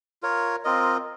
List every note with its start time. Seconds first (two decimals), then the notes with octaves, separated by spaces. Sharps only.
0.23 F4 A#4 C#5
0.64 C4 F4 A#4 D#5